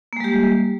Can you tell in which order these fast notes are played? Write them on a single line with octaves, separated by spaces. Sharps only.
A#3 G#3 G3 G4